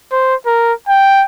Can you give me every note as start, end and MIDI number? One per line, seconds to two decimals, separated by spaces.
0.12 0.35 72
0.46 0.73 70
0.88 1.26 79